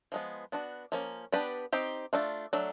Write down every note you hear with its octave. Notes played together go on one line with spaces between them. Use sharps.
F3 G#3 B3
B3 D4 F#4
F3 A#3 C#4
B3 D4 G4 B4 D5
C4 D#4 G4
A3 D4 F4
F#3 A3 D4